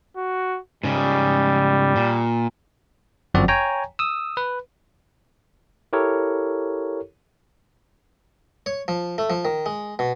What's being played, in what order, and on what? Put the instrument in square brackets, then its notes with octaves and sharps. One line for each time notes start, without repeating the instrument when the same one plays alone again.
[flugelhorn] F#4
[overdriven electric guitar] G#2 C#3 [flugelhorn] G3
[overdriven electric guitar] A#2
[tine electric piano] G1 F#2 F3 C4 F#4 D5
C#5 G5 G#5 A#5
D#6 E6
B4
E4 G4 A4 A#4 C#5
[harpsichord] C#5
F3
A3
F3
D#3
G#3
B2